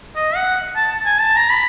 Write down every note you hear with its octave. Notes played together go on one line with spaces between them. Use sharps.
D#5
F#5
A5
G#5
A5
A#5
B5